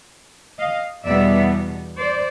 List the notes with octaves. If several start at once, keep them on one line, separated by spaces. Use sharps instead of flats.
D#5 F5
E2 B2 G3 B3 D5 E5
C5 D5